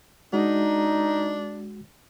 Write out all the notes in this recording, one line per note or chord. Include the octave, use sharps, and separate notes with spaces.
G#3 D4 D#4 F#4